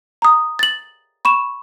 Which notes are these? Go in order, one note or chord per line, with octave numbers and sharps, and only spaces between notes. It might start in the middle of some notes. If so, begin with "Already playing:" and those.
A#5 D#6
A6 F#7
B5 C#6 E7